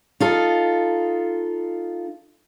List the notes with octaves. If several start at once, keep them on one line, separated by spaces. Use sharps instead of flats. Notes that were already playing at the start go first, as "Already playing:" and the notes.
D#4 F4 A4